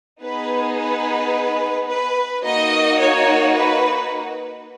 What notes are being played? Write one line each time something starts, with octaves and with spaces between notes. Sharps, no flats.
B3 D#4 G#4 B4
B4
B4
A#3 D#4 F#4 D#5
C#5
B4